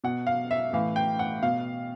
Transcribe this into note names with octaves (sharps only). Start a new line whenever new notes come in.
B2 F#5
F5
E5
A2 E3 F5
G5
F#5
B2 F5